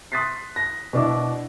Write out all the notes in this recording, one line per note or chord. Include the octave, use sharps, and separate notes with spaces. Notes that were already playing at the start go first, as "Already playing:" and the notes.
C6 D#6 F#6 A6 B6 C7
A#6
B2 D4 E4